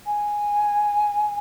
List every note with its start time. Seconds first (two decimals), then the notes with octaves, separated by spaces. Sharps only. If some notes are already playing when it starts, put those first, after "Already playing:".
0.06 G#5